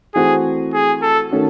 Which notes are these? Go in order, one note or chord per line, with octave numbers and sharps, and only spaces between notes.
E3 A3 C4 F#4 G#4 C5
G#4
A4
D#3 A3 C#4 F#4